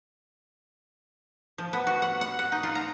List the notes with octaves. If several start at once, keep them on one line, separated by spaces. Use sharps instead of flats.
F3
B3
F#4
F#5
F#5
F#5
D#4
F4
A#5